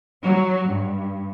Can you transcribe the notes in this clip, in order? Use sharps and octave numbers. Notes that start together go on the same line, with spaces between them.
F#3
G2